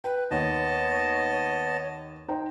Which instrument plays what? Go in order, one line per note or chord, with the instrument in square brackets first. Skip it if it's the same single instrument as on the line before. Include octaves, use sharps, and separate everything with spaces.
[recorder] B4 [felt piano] G5
[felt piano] D#2 [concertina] B3 D#5 A5 [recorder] C#5
[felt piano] D#4 C5 G5